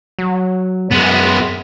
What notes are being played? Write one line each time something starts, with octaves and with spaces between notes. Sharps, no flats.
F#3
F#2 G#3 B3